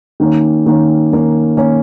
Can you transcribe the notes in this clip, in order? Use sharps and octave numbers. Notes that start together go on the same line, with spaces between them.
D#3 A#3 C#4
D#3 A#3 C#4
D#3 A#3 C#4
D#3 A#3 C#4